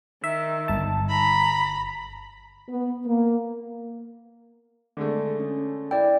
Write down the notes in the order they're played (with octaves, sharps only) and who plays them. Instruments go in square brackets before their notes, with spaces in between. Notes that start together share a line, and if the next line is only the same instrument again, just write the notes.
[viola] D#3 [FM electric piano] E5
[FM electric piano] G1 A5
[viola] A#5 B5
[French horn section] B3
A#3
[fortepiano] D3 G#3 A3
[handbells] C#4
[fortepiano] E4 [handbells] D5 G5